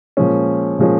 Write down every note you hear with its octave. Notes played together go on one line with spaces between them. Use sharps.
A#2 F3 G#3 C#4
A#2 F3 G#3 C#4